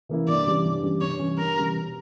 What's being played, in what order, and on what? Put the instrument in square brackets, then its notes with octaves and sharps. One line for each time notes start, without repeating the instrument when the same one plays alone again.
[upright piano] E3 A#3 C#4 E4
[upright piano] G2 [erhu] D5
[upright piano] E3 G3 C#4 G4
G2
E3 G3 C#4 G4
[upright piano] G2 [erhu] C#5
[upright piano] E3 G3 C#4 G4
[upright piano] G2 [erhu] A#4
[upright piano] E3 G3 C#4 G4
B2